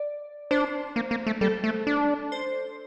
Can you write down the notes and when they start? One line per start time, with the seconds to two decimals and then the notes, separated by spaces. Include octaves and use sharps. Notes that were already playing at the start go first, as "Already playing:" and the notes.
Already playing: D5
0.51 D4 C5
0.96 A#3
1.11 A#3
1.27 A3
1.41 G3 A4
1.64 A3
1.87 D4
2.32 C5